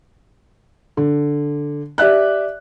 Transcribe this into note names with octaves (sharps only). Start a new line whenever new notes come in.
D3
G4 D5 E5 F#6